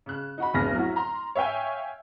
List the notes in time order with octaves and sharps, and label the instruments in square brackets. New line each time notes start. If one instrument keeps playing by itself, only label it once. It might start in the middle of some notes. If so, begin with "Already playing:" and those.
[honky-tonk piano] C#3 F#6
D#4 F#4 B5
F1 B1 D4 G#4 F6 A#6
F#3 E4 F#4
A#5 C6
C#5 E5 F5 G5 G#5